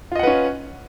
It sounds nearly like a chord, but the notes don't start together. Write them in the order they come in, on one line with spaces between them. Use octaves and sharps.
F4 D#5 F#5 B4 C#4